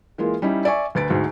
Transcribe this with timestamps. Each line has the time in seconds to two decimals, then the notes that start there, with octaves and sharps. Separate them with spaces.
0.18 E3 G#3 A#3 F4
0.42 G3 C#4 D#4 E4
0.65 D5 E5 G#5 C#6
0.95 D2 B4 A6 D7
1.10 D2 G#2 F#4